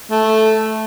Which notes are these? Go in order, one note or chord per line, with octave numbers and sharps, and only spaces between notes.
A3